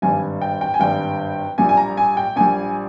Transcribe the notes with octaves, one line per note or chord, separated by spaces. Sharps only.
G#1 G2 G3 G#5
G5
G5
G#5
G#1 G2 G3 G5
A#1 A#2 G3 G#5
G#5
A#5
G#5
G5
A#1 A#2 G3 G#5